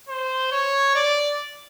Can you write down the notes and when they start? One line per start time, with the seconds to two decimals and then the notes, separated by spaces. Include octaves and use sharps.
0.09 C5
0.52 C#5
0.95 D5